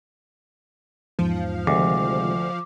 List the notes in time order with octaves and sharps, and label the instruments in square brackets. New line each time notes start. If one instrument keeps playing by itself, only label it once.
[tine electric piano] E2 G#2 [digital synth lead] F3
[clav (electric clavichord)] D2 [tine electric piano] C3 D#3 G#3 [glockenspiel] D6